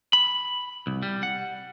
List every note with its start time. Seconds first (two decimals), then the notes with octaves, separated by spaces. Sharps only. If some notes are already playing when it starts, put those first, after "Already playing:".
0.13 B5
0.87 C2
1.03 G3
1.23 F#5